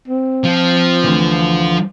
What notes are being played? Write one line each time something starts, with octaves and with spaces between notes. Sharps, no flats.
C4
F3
D2 D3 E3